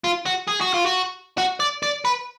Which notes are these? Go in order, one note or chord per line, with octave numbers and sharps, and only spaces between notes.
F4
F#4
G#4
F#4
F4
F#4
F#4
D5
D5
B4